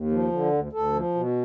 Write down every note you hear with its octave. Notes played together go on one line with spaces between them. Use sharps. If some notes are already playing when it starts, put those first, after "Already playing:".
Already playing: D#2
F3
D3
D2
D2 A4
F3
B2